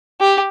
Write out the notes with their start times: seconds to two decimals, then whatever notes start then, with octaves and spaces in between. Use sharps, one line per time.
0.21 G4